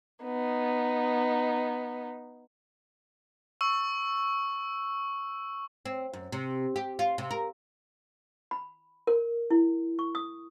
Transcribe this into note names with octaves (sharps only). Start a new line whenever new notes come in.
B3 D#4
C#6 E6
C4
F#2
C3
G4
F4
C3
A#4
B5
A#4
E4
C#6
D#6